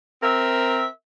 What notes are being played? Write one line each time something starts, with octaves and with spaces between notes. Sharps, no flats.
C4 A#4 E5